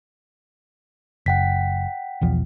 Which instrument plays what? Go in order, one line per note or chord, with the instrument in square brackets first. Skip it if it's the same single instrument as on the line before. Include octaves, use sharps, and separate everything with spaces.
[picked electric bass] F#1 [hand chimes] F#5 G5 B6
[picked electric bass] B1 E2 F3